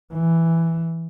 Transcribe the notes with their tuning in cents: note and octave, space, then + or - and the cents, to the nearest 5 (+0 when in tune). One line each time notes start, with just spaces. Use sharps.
E3 +5